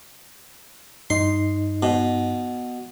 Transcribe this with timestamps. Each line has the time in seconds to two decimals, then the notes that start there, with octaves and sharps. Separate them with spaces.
1.10 G2 D#4 D#5 C6
1.83 B2